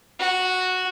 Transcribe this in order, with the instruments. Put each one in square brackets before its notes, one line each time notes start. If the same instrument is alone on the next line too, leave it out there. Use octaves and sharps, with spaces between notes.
[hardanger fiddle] F#4